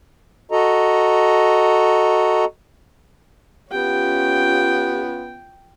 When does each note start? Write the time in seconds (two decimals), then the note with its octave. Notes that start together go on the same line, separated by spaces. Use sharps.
0.51 F#4 A4 D#5 A#5
3.71 B3 C#4 F4 G4 G5